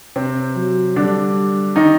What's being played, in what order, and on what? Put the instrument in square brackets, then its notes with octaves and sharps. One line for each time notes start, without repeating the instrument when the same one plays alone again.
[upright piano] C3 C4
[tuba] F#3
[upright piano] D3 D4 [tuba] G3
[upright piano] D#3 D#4